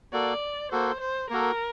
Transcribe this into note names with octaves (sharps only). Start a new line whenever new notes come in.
A#3 F#4 A4 D5
A#3 F#4 A4 C5
C5
A#3 F#4 A4 A#4